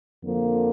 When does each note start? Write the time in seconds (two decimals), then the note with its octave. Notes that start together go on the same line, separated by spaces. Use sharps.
0.22 F2 D3 F3 A#3